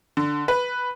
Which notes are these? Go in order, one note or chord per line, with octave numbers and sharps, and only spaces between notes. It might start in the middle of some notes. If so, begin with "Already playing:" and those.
D3
B4